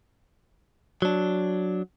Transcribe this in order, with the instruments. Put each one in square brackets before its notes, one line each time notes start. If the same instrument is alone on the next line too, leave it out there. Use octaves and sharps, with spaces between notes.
[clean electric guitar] F#3 D4